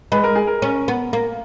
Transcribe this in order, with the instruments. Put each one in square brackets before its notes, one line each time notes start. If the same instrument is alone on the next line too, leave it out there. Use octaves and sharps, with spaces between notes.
[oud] G#3 [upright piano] B4
[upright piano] A#4
G#4
A#4
[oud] C#4
B3
A#3